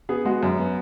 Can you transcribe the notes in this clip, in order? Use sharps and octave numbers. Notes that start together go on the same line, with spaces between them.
B3 G#4
G#3 F#4
F#2
B3